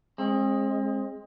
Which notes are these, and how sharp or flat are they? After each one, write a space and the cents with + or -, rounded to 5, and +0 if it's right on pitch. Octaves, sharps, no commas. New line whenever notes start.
G#3 +0 C4 +40